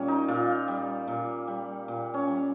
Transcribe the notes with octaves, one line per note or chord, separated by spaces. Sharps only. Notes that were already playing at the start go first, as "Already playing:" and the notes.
Already playing: A#2 G3 C#4
D#4
A#2 F4
G3
A#2
G3
A#2
C#4
G3